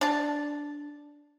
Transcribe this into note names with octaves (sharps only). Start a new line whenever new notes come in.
D4 A5